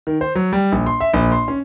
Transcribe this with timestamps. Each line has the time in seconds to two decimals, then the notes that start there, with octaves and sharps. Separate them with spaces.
0.07 D#3
0.21 C5
0.35 F#3
0.52 G3
0.72 A#1
0.86 C6
1.01 E5
1.14 A#1
1.32 C6
1.48 C#4